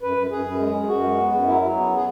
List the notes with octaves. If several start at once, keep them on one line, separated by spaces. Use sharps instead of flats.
F#2 B4
F#2
F#2 G#4
F#2
G#3
F#2
F#2 F#4
G#3
B3
F#2
F#3 E4
F#3
B3
G#4